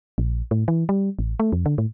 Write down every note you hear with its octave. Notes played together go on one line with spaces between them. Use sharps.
A#1
A2
E3
G3
A1
A3
F2
D3
A2